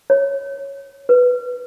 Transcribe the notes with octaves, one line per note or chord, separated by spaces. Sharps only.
C#5
B4